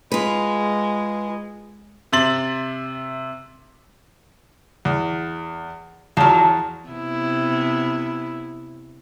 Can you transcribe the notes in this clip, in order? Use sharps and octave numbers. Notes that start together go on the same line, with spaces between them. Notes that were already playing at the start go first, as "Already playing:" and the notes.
G#3 F4 B4
C3 E5 C6 A6 F#7
E2
E2 F3 F#3
C3 B3 E4